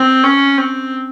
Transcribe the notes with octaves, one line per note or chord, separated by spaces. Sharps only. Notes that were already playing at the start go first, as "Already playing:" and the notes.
Already playing: C4
C#4
C4